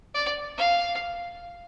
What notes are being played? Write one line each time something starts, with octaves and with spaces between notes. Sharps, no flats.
D5
F5